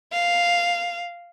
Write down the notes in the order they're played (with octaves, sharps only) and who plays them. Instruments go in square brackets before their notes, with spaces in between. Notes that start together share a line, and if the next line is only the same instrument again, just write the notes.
[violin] F5